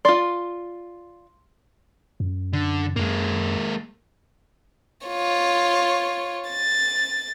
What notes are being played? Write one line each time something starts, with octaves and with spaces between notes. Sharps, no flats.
F4 D5 C6
F#2
D3
F#2 G#3 A#3
F4 C#5
A6